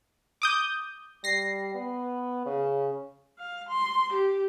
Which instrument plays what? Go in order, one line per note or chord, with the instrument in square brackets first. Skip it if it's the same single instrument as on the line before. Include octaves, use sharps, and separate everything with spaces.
[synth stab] D6 D#6 G6
[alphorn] G3 [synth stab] A#6 C7
[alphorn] B3
C#3
[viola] F5
C6
G4